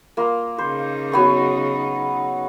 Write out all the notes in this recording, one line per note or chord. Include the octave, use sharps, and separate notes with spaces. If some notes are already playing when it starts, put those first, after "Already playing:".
A#3 F4
C#3 D#4 C5
F#3 B3 C#6